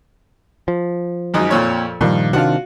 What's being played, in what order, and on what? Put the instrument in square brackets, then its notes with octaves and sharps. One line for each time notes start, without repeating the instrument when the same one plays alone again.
[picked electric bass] F3
[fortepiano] G#1 F#2 D#4
F2 A#2 C#5
[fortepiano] G2 [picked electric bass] A#2 D#3 F3
[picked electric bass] C3 D#3 D4 [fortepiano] F4 F#4